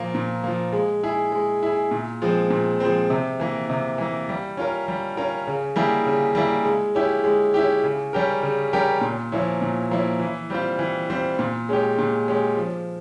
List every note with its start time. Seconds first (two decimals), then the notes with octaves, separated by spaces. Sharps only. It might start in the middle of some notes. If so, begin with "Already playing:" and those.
Already playing: A#2 F3 A#3
0.15 A#2
0.44 F3 A#3
0.73 G#3
1.03 E4 G#4
1.32 G#3
1.63 E4 G#4
1.91 A#2
2.22 F3 G#3 C4
2.50 A#2
2.80 F3 G#3 C4
3.10 C3
3.40 E3 A#3
3.70 C3
3.98 E3 A#3
4.29 G3
4.57 C#4 F4 A#4
4.88 G3
5.17 C#4 F4 A#4
5.47 C#3
5.76 G3 A#3 E4 G#4
6.07 C#3
6.35 G3 A#3 E4 G#4
6.65 G#3
6.95 C#4 E4 G4
7.24 G#3
7.54 C#4 E4 G4
7.83 C#3
8.13 G3 C#4 G4 A#4
8.43 C#3
8.73 G3 C#4 G4 A#4
9.01 A#2
9.32 F3 A#3 C#4 E4
9.62 A#2
9.91 F3 A#3 C#4 E4
10.20 E3
10.50 G3 C4 F4
10.79 E3
11.10 G3 C4 F4
11.39 A#2
11.69 G#3 C#4 G4
11.98 A#2
12.28 G#3 C#4 G4
12.57 F3